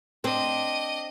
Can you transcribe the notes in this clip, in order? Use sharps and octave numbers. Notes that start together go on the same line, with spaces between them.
C4 D4 D#5